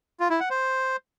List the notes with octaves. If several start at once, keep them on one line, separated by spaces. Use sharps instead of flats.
F4
E4
F#5
C5